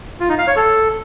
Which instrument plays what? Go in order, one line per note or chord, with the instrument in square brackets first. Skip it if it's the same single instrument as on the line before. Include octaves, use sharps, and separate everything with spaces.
[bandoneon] F4
D#4
F5
C#5
A4